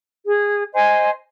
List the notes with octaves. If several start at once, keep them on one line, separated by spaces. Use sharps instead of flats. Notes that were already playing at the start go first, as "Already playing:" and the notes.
G#4
C5 D#5 G#5